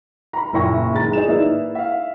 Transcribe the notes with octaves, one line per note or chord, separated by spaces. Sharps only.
A#5 B5
F#1 A#2 E4 G5 C#6 A#6
D#3 G#3 A#5 A6
D#4 G#4 E7
A#3 E4 B4 D5
E5 F5